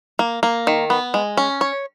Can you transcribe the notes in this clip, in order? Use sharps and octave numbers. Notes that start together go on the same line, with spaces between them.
A#3
A#3
D#3
B3
G#3
C#4
C#5